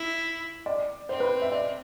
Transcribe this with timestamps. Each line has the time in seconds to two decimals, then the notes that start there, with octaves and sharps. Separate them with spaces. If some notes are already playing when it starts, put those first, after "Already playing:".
Already playing: E4
0.66 D5
1.09 C4 C5
1.20 B4
1.42 E5
1.52 D5